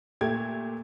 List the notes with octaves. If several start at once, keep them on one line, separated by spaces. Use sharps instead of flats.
A#2 A3 G4 G#6